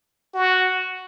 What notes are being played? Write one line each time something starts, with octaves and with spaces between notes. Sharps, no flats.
F#4